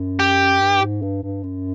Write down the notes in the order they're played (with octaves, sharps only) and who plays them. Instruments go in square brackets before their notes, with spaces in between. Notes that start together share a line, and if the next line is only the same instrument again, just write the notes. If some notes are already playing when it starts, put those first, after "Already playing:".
Already playing: [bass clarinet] F#2
[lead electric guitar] G4
[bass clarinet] G2
G#2
G2
G2
F#2